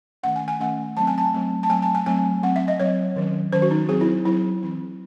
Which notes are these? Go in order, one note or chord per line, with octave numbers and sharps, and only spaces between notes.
D#3 A3 C#4 F#5
G#5
G#5
D#3 A3 C#4 F#5
F#3 A3 C4 A5
G#5
A5
F#3 A3 C4
A5
F#3 A3 C4 G#5
A5
G#5
F#3 A3 C4 G#5
F#3 C4 F#5
E5
D#5
F#3 C4 C#5
D#3 F#3 C#4
D#3 F#3 C#4 C5
F#4
D#4
F#3 C4 G#4
E4
F#3 C4 E4
E3 C4